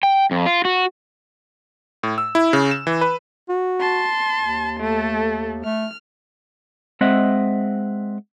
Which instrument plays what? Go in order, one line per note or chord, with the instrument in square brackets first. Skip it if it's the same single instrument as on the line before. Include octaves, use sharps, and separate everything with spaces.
[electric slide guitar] G5
F2
F4
F#4
[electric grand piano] A2
E6
E4
C#3
E7
E3
B4
[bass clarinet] F#4
[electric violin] A5 C6
[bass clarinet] D#2
[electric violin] A3 A4
[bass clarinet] A3 [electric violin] F6
[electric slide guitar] G#3 C4 D#5 E5 F#5